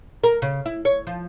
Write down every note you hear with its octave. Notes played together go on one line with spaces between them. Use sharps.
A#4
C#3
E4
C#5
F3